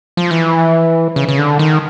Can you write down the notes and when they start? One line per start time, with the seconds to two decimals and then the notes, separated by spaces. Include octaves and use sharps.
0.17 F3
0.31 E3
1.16 C#3
1.29 C#3
1.39 D3
1.59 D#3